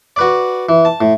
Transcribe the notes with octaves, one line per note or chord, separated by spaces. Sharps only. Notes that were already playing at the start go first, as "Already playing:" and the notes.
F#4 B4 D5
E3
A5
A2